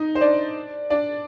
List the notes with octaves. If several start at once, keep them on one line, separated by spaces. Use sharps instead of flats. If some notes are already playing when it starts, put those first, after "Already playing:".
Already playing: D#4 D#5
C5
D4 D5
D4 D5